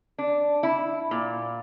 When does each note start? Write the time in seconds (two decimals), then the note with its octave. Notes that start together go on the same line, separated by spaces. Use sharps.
0.18 D4
0.63 E4
1.11 A#2